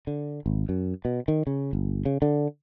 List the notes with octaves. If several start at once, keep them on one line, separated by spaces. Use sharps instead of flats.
D3
G#1
F#2
B2
D#3
C#3
G1
C#3
D3